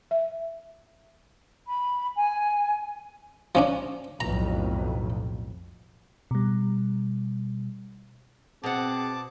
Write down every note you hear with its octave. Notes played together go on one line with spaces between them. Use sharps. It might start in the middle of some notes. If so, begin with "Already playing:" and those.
E5
B5
G#5
F3 C#4 D4
B1 F2 A2 A#5
B2 G3
B2 C4 G#4 F#5 A5 D6